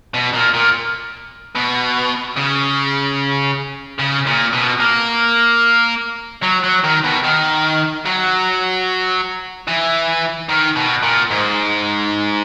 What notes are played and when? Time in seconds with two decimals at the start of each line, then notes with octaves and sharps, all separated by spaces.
0.14 B2
0.34 A#2
0.54 A#2
1.55 B2
2.37 C#3
4.00 C#3
4.27 A#2
4.53 B2
4.80 A#3
6.43 F#3
6.64 F#3
6.84 D#3
7.04 B2
7.24 D#3
8.06 F#3
9.68 E3
10.49 D#3
10.76 B2
11.03 A#2
11.30 G#2